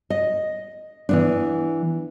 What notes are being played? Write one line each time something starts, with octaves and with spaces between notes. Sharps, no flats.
D#5
E3 B3 D4